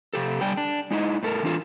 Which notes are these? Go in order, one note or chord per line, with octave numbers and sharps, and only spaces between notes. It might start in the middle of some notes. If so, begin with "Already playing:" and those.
C3 G4 A4
D3 G3 D5 G5 G#5
D4
G#3 D#4 E4 D#5
A2 A4 A#4
E3 D4 F4 A4